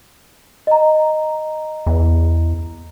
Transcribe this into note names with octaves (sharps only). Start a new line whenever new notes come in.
D#5 A#5
E2